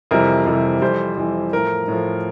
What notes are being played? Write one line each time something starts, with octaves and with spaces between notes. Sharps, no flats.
F2 C3 E3 G3 A#4
F2 C3 E3 G3
F2 E3 G3 C5
F2 E3 G3
A2 F3 A#4
A2 F3